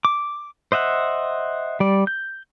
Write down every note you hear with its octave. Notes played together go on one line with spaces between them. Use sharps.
D6
C5 D#5 E5 F#5
G3 D5
G6